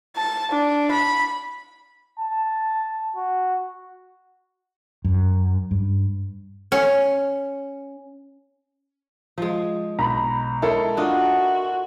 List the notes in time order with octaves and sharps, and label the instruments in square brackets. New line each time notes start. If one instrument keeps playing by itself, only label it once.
[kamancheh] A5
D4
B5
[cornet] A5
F#4
[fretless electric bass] F#2
G2
[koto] C#4
[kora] F3 G#3
[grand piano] B1 [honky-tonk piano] A#5 B5
[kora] G#3 C#4 [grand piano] E4 A4 A#4
[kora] D4 F4 D#5 [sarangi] F#4